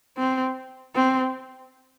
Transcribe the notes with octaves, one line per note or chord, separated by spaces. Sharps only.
C4
C4